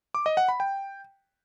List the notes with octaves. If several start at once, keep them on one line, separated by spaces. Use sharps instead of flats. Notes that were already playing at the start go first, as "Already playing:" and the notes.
D6
D#5
F#5
B5
G5